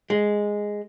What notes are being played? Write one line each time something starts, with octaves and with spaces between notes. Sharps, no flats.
G#3